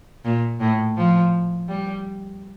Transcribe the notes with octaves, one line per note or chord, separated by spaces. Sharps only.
A#2
A2
F3
G3